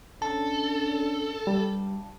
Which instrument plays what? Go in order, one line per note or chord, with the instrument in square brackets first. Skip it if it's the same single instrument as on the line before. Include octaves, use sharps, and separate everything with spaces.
[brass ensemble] C#4 D4 [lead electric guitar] A4 [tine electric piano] A5
[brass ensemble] G2 [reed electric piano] G3